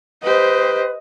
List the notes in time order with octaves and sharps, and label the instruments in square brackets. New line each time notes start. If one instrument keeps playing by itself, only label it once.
[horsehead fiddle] G4 C5 [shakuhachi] B4 [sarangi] D#5